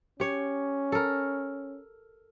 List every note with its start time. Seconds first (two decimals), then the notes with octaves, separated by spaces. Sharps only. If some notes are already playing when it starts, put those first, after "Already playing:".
0.20 C#4 G4 C#5
0.92 A4 A#4